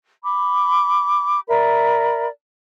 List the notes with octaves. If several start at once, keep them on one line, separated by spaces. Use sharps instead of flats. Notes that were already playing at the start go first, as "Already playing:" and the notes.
B5 D6
A#4 D5 E5 B5